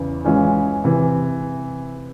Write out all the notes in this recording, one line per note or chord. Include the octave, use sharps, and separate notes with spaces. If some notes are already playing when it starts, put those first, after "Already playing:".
Already playing: E2 C#3 E3
E3 G#3 C#4 F4
C3 E3